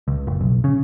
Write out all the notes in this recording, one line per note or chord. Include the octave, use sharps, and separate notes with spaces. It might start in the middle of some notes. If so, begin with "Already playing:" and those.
C#2
F#1
B1
C#3